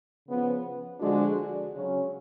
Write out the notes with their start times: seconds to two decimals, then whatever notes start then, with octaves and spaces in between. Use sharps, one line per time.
0.27 C#3 F3 B3
1.00 D3 F3 G#3 D4 F#4
1.73 C#3 F#3 C#4